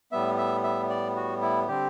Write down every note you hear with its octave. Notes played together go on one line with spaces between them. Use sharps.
A2 G3 B3 E5
E5
E5
D5
F#4
E4
D3 G3 C4 G4